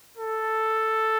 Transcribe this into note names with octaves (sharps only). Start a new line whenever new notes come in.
A4